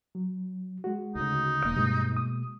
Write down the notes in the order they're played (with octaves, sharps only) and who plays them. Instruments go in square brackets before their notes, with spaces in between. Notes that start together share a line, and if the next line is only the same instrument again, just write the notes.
[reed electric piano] F#3
G#3 F#4
[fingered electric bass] D2 C#3 [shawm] D#4
[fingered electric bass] E1 A#3
[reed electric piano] G2 [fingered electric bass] B2 G#3 A#3
[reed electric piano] D#6